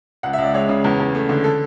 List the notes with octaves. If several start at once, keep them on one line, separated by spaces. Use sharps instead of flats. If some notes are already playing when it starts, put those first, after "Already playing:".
C#2 F#5
E5
C#2
D5
G#3 C#5
C#3
E2
E2
A3
D3
A4